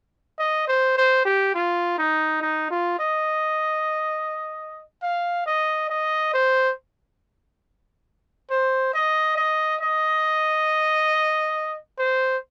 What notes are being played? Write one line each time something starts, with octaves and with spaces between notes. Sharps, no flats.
D#5
C5
C5
G4
F4
D#4
D#4
F4
D#5
F5
D#5
D#5
C5
C5
D#5
D#5
D#5
C5